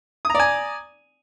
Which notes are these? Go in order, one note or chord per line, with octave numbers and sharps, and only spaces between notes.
D5 G#5 A#5 D#6